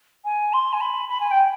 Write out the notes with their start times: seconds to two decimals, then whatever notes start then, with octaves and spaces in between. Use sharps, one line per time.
0.25 G#5
0.53 C6
0.73 G#5
0.80 B5
1.09 B5
1.20 G#5
1.31 G5